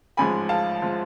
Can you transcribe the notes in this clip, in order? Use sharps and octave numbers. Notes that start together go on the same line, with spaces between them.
A1 G#2 F3 G#3 G#5 B5
F5 A5
F3 G#3